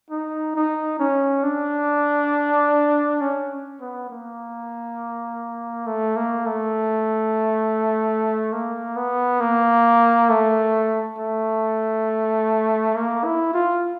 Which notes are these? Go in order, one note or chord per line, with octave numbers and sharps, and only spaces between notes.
D#4
D#4
C#4
D4
C#4
B3
A#3
A3
A#3
A3
A#3
B3
A#3
A3
A3
A#3
E4
F4